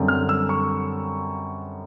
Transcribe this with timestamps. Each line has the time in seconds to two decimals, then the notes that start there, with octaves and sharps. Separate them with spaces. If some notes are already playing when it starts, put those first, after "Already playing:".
Already playing: F#2 D3 G3 C4
0.08 F6
0.29 E6
0.49 C#6